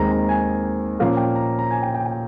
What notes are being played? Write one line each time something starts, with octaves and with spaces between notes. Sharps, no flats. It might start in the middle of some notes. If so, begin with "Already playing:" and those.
Already playing: D#2 D#3 G#3 C4 A#5
A#5
G#5
A#2 F3 A#3 C#4 F5
G5
A#5
A#5
G#5
G5
G5
G5